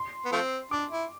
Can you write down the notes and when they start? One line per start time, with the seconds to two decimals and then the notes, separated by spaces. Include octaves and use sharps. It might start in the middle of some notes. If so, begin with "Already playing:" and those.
Already playing: C6
0.25 B3
0.32 F3 A3 C4
0.71 D4 D6
0.91 E4